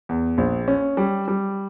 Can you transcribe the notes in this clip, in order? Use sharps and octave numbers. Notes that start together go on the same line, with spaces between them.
E2
A#1
C#4
G3
G3